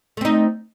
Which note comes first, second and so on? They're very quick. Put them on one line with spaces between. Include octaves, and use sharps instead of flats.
A3 C4 D#4